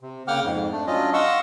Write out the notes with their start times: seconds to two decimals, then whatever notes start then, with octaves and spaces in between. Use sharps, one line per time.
0.01 C3
0.28 C#3 A#3 F#5 G5 D6 F6
0.44 F2 G#2
0.72 A3 D4
0.87 F#3 C#4 D4 F4 D#5
1.13 D#5 F5 F#5 C6 C#6 E6